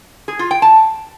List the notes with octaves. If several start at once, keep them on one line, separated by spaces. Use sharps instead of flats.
G#4
F4
G5
A5